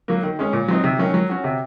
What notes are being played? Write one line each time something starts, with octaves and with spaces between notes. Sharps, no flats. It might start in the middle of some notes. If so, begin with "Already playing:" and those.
F#3 A#3
D#3
G#3 C#4
A#2
F#3 C4 D#4
C3
D#3 F#3 C#4
F#3
C#4 F#4
C3